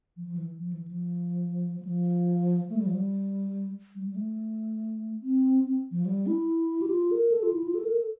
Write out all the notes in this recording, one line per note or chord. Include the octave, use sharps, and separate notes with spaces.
F3
F3
E3
F3
E3
F3
G3
F3
A3
G3
F3
G3
G3
G3
A3
C4
C4
F3
G3
E4
G4
F4
A#4
A4
F4
E4
F4
A4
A#4
A4